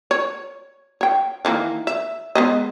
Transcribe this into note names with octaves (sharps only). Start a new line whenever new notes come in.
C#5
C#5 G5
D#3 E3 A#3
E5
G#3 B3 D#5